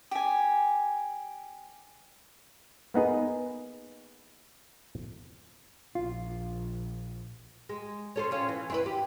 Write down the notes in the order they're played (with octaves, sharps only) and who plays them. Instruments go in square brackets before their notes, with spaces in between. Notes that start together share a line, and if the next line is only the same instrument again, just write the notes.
[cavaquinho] G4 G#5
[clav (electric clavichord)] A#3 B3 D#4 G#4 B4
[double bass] A#1 [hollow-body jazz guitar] F4
[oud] G#3
C#4 A4 C5
C4 C#4 F4
E3
C4 E4 B4
G4